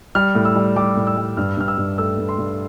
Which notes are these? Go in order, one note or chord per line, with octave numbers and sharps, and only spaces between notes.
G3 F6
A2
E6
G3
G3 D6
A2
E6
G3
G2 F6
G2 F6
E6
G2
A3 E6
G2
C6
G2